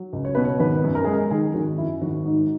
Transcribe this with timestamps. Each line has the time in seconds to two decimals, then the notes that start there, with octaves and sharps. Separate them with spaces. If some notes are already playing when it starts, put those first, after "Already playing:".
Already playing: F#3
0.13 C#2
0.25 C#5
0.35 B2 B4
0.44 C#5
0.59 G#1 B4
0.84 F#2
0.95 A#4
1.04 G#3 G#4
1.13 A#4
1.30 D#3 G#4
1.54 G#1 F#4
1.78 F#2 E4
2.01 G#1 F#4
2.25 G#2